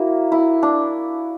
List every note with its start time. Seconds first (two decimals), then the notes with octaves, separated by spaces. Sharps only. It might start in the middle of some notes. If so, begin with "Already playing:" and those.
Already playing: A#3 E4 F#4 A#4
0.32 E4
0.63 D4